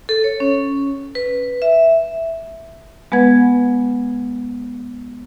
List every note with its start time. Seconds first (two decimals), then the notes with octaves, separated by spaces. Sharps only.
0.09 A4
0.24 C#5
0.40 C#4
1.15 B4
1.62 E5
3.12 G#3 B3 B4 F#5 G#6